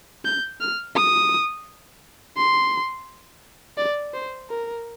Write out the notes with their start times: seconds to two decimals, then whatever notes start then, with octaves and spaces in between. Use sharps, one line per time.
0.25 G6
0.60 F6
0.95 D#6
2.37 C6
3.77 D5
4.14 C5
4.49 A#4